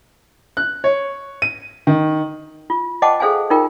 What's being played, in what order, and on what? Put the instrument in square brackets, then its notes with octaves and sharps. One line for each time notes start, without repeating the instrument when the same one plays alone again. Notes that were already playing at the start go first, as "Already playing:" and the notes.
[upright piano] F#6
C#5
D#7
D#3
[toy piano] F4
C5 D#5 F#5 G5 A5 D6
G#4 A4 C5 F5 G5 G#5
D#4 F4 A#4 G5